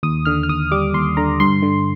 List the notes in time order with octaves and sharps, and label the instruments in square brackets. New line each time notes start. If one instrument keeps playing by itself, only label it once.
[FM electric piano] D#2 D#6
D3 F6
F6
D#2 D#6
G3 D6
D#2 C6
D3 A#5
G2 C6
D3